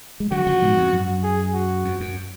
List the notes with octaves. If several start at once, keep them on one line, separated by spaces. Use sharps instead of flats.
G#3
D3 F#3 F#4
C#3 F3
G#2 B2
F2 G#2
F#2
G#4
F#4
F2
F#2